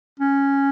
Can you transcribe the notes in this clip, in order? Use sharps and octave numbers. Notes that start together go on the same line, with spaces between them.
C#4